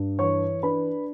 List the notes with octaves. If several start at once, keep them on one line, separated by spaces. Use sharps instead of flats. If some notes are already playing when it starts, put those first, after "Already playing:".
Already playing: G2
E3 C#5 C#6
D4 B4 B5